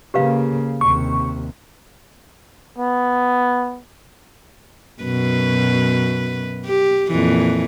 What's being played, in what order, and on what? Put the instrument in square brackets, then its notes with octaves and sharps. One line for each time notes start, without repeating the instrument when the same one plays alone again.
[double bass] C#3 A#3 [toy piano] G4 B4 F5
[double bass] D#2 C3 [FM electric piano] C#6
[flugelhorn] B3
[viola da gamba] F#2 B2 B4
G4
F2 A#2 E3